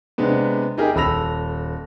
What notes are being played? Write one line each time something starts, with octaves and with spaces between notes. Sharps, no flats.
C3 G#3 B3 D4
D#4 E4 G4 G#4 A#4 D#5
D#1 A4 B5 E6 A#6 F7